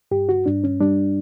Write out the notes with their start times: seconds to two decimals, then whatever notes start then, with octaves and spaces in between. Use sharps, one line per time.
0.11 G2 G4
0.29 F#4
0.46 G2 D4
0.64 C#4
0.80 G3 D4